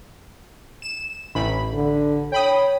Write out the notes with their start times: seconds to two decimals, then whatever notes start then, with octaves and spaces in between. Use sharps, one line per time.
0.82 E7
1.35 A1 B5
1.74 D3
2.32 C#5 G5 B5 D#6